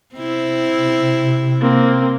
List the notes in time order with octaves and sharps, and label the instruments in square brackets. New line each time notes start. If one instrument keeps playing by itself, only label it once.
[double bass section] C3 [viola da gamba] C4 E4
[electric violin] A#3 C4